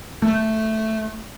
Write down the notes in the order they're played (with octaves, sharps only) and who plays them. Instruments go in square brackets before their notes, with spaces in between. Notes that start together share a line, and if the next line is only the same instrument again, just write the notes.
[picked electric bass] A3